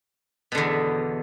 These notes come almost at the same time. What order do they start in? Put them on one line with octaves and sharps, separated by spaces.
B2 D3 E2